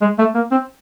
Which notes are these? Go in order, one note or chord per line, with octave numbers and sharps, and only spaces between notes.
G#3
A3
A#3
C4